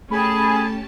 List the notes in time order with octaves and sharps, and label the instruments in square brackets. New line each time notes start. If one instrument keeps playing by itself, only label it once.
[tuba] A3 [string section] C#4 G4 A5 [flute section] G#4 [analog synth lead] B5